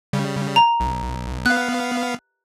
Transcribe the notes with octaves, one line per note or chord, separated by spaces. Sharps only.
C#3 G3
A#5
B1
B3 F5 F#6